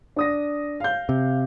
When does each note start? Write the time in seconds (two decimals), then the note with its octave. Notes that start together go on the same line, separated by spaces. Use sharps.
0.16 D4 D#6 A#6
0.80 F5 G6
1.09 C3